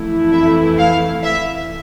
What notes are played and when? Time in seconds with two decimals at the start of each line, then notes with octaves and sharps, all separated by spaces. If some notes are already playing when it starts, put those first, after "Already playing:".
Already playing: F2 E3 A3 E4
0.33 E5
0.78 F5
1.23 E5